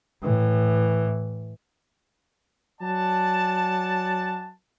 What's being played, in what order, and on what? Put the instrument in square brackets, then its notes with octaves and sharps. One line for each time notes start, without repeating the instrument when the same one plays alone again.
[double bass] A2 E3
[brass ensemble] F#3 D5 F#5 G#5 A5